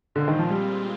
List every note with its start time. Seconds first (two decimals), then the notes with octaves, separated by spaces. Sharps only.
0.15 A#2 D3 G#3 C4 F4
0.28 D#3
0.39 F3
0.50 G3